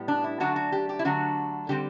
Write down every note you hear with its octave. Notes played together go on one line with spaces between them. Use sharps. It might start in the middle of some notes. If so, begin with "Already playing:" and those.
Already playing: A2 G3 B3
D4
E4
D3 F#3 A3 D4 F#4
F#4
G4
G4
E4
D3 F#3 A3 D4 F#4
D3 G3 C4 G4